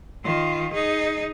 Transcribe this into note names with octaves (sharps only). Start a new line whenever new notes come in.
D#3 F4
D#4 G#4